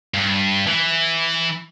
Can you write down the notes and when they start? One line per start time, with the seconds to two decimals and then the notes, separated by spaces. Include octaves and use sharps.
0.14 G2
0.67 E3